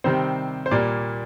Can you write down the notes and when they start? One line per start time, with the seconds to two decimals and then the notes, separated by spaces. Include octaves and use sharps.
0.04 C3 D#3 G3 C4 C5
0.66 C5
0.71 A#2 G3 A#3 D5